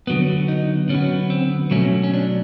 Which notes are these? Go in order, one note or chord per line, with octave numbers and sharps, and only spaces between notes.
D3 F#3 B3
D#4
D3 F#3 B3 C#4
C4
B2 F#3 A3 C#4
C#4
D4